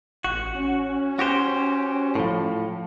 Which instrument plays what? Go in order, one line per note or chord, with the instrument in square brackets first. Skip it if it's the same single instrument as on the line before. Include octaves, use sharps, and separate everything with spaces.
[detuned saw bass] A1 [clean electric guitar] F#4
[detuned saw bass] C#4
[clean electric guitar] F#4 G4 C5
A2 F3